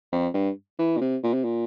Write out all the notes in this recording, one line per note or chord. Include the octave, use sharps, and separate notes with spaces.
F2
G2
E3
A#2
C3
A#2
C3
A#2